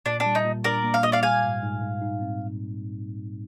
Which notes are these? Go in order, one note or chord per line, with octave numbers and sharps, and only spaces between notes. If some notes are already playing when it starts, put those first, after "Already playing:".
A#2 D4
D4
G3
D#4
A#2
D4 A#4 D5
A#3
F5
A#2 D#5
D5 F5
G3 F5 G#5
G#2
G#2
G#2
D#4
C4